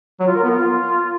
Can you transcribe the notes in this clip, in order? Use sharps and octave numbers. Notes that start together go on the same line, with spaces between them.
F#3
F4
A#4
B3
F4